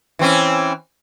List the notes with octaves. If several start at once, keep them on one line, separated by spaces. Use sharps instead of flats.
E3 C4 C#4